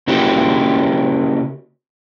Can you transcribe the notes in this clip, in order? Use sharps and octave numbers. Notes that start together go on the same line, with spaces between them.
C#3 A#3 E4 F#4 G4